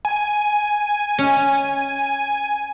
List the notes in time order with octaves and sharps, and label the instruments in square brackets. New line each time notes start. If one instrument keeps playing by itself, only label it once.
[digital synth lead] G#5
[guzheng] C#4